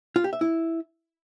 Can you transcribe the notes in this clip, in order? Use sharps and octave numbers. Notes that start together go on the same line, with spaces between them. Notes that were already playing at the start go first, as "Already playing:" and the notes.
F4
G4
E5
E4